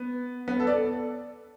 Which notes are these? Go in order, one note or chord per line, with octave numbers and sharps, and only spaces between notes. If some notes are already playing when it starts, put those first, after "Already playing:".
Already playing: B3
B3
A4
D5